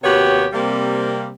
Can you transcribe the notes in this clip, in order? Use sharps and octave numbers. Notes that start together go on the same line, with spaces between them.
D#2 C3 B3 F#4 G4 C#5
C3 G3 A#3